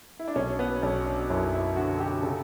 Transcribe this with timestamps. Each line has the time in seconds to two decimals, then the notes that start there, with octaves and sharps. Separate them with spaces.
0.19 E4
0.28 D4
0.35 B1 C#4
0.59 B3
0.83 B1 C#4
1.06 D4
1.29 F#2 E4
1.53 E4
1.76 D3 F#4
2.00 G4
2.23 C#3 A4